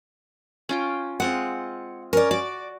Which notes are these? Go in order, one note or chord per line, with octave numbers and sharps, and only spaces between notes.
C#4 F4 G5
G#3 C4 F4 F#5
C#4 A#4 D5
F#4 D5 D6